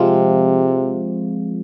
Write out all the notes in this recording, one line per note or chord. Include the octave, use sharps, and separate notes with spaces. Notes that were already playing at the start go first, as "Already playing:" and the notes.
Already playing: C3 F3 G#3 C4 F4